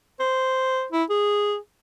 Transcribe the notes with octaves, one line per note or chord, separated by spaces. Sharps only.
C5
E4
G#4